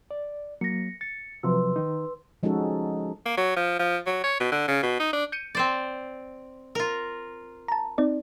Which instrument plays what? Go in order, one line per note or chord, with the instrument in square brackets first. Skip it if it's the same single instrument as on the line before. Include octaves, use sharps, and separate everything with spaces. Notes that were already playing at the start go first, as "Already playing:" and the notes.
[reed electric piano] D5
[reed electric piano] F#3 A#3 [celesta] A#6 C#7
[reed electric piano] A6 [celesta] C#7
[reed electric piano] C3 F3 F#3 [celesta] B4 C6 E6
[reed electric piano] D#3 D#4
[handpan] F3 G#3 C#4 D#4 F#4 A4
[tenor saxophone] A#3
F#3
F3
F3
F#3
C#5
B2
D3
C#3
B2
D#4
D4
[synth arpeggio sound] G6 C#7 D#7
[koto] C4 C5 D5
F4 A#4
[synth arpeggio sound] A5 A#5
C4 D#4 D5